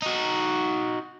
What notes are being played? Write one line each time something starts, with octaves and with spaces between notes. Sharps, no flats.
D#4 F#4